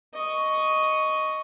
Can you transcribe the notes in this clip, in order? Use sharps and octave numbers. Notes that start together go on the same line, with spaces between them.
D#5 C#6